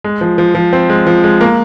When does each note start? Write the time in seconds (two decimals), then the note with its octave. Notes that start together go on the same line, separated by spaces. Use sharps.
0.04 G#3
0.21 F3
0.38 F3
0.55 F3
0.73 C4
0.90 G#3
1.07 F3
1.24 G#3
1.41 A#3